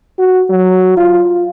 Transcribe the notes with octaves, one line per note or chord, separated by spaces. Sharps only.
F#4
F#3
F4